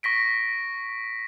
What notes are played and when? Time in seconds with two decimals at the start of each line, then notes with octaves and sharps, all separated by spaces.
0.03 C#6 A#6 B6 D7